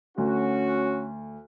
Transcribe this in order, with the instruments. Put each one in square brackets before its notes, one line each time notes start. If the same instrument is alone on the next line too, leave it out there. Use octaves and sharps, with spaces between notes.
[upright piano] D2 [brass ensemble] C#4 F#4